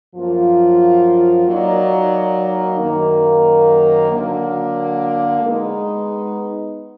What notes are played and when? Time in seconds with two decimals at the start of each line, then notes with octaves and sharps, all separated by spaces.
0.15 F#2 F3 A#3 F4
1.47 F#3 A#3 D#4 A#4 D5
2.79 F#2 D#3 A#3
4.12 D3 F#3 A#3
5.42 G#3 B3 D#4